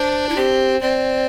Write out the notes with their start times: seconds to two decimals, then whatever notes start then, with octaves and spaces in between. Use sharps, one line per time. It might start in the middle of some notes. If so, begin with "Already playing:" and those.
Already playing: D4 C5
0.29 E4
0.37 C4 G4
0.81 C4 D5